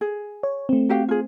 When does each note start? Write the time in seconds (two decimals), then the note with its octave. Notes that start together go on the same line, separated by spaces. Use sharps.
0.01 G#4
0.43 C#5
0.69 A3 C4
0.89 F#4 G4 F5
1.08 F4 G#4